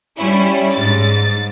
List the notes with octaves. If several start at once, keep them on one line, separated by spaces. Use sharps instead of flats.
G3 C#4 E4
G#2 A6